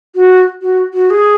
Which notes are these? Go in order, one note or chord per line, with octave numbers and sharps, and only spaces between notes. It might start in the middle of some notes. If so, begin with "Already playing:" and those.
F#4
F#4
F#4
G#4